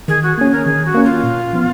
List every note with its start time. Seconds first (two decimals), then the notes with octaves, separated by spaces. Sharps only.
0.08 D#3 G#4
0.23 F#4
0.37 A#3 C#4 G#4
0.52 A#4
0.66 D#3 G#4
0.85 F#4
0.94 A#3 C#4
1.04 F4
1.23 A#2
1.53 F3 B3